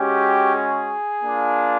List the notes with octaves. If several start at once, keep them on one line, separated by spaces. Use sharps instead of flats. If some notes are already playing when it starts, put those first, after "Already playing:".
Already playing: G#3 C#4 F#4 G4
G#4
A#3 D4 F4